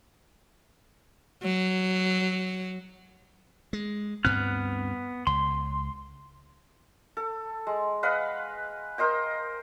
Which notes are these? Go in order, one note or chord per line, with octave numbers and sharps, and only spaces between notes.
F#3
G#3
D2 G2 B3 C4 F6 F#6
C#2 C6
A4
G#3
B4 D#5 F5 F#5
A#4 C5 D#5 G5